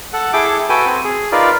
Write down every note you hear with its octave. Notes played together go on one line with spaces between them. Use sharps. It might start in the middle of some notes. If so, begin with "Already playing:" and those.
A4 F#5
E4 G#4 A4 G5 D6
F#4 A4 B4 G5 G#5
C4
G#4
D#4 F4 A#4 B4 D5